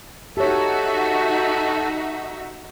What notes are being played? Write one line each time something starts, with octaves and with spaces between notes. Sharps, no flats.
D#4 F#4 G4 A4 C#5 E5